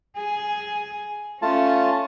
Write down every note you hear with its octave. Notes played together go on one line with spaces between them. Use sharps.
G#4
A3 C#4 F4 A5